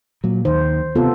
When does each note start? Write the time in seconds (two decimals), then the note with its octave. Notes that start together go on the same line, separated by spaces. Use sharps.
0.24 A#2 F#3
0.45 D#2 D#3 C5
0.96 C3 B3 F4 A4